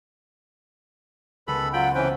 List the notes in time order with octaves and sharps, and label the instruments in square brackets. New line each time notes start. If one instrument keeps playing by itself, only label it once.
[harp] C#2 B3 [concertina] A4 B5 [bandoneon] B4
[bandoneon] F#3 F4 [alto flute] F#5 [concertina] G5 B5
[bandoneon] C3 E3 C#4 [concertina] B4 G5 [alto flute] C5